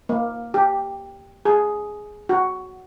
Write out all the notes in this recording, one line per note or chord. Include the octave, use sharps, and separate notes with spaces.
A#3
G4
G#4
F#4